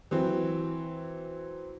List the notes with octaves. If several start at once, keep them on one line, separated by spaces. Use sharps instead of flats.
E3 F#3 C4